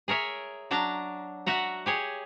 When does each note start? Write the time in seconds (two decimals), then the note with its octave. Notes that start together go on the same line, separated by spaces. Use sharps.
0.08 G#4 A#4 C#5 E5
0.71 F#3 D4 A5 A#5
1.46 F#4 E5 F#5 A#5
1.86 G4 G#4 C#5